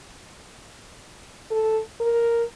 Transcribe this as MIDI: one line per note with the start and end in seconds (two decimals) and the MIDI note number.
1.51 1.81 69
2.00 2.44 70